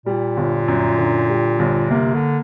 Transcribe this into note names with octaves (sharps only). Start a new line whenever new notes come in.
A#2 G3
G1
F#2
D3
G3
G1
C3 A#3
D3